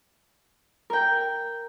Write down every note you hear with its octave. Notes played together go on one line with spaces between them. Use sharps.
A#4 G5